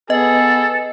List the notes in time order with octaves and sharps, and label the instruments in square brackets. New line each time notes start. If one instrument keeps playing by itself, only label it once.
[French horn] B3 [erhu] G#4 [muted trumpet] A4 [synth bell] D#5